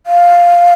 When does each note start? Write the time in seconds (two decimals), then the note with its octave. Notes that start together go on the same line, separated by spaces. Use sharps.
0.07 F5